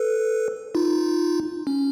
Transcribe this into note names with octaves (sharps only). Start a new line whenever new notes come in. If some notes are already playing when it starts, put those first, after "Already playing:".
Already playing: A4 B4
D#4 F4
C#4